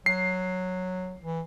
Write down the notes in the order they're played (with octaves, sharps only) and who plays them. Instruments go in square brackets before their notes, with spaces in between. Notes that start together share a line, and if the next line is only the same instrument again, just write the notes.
[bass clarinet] F#3 [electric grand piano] C7
[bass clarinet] E3